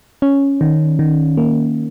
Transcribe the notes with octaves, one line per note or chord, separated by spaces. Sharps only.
C#4
D#3
D#3
A#3